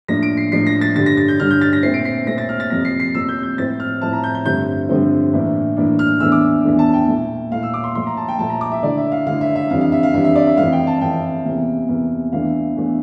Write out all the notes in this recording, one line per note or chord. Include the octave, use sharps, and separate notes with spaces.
A2 F3 A#3 D4 A#6
D7
C7
A2 F3 A#3 D4 C7
A#6
A6
G2 D3 G3 D4 A6
A#6
A6
G6
G2 D3 G3 D4 F6
G6
A6
A#6
A#2 A3 C4 C7
D7
C7
A#2 A3 C4 A#6
A6
F6
A6
F2 C3 F3 A#3 A#6
C7
C7
F2 C3 F3 A#3 E6
G6
G6
A2 F3 C4 E4 A6
F6
A2 F3 C4 E4 A5
A#5
G6
G6
G2 D3 F3 A3 C4 G6
G2 D3 F3 A3 C4
A2 E3 A#3 D4
A2 E3 A#3 D4
F6
E2 E3 A3 D4 E6
D6
E2 E3 A3 D4
A5
G5
A#2 A3 E4
A#2 A3 E4 F5
E6
D6
C6
A#2 F3 A3 C6
A#5
A5
G5
A#2 F3 A3 A5
A#5
D6
E5
D3 A3 E4 D5
E5
F5
D3 A3 E4 F5
E5
E5
F2 E3 G3 D4 F5
F5
E5
F5
F2 E3 G3 D4 E5
E5
D5
E5
F2 E3 A3 F5
G5
A5
F2 E3 A3 G5
E2 C3 E3 A#3
E2 C3 E3 A#3
E2 E3 A3 D4 F5
E2 E3 A3 D4